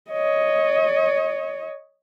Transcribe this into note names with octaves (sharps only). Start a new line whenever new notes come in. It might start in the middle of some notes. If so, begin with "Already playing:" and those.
C#5 D#5